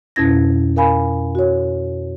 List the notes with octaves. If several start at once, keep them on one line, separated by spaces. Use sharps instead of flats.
F2 B2 C#4 E4 G#6 A#6
A#4 F5 G#5 B5
F#4 C#5